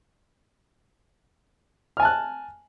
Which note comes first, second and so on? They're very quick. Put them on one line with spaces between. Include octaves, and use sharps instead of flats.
F6 G#5 A5 F#6